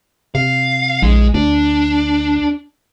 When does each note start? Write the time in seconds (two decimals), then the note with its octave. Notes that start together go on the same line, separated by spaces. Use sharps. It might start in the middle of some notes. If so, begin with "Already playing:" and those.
0.35 C3 F5
1.02 A#1 G#3
1.34 D2 D4